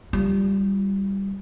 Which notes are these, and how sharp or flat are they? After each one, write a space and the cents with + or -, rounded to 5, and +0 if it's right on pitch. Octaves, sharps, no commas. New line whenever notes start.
G3 +0 F4 +0